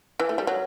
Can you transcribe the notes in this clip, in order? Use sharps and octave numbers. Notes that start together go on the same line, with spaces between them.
E3
A3
G3
F#3